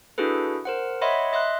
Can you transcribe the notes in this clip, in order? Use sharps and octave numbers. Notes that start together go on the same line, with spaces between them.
D4 E4 F#4 G#4 A4 B4
A#4 C5 F#5
C#5 D#5 E5 F#5 B5 C6
D#5 E5 C6 F#6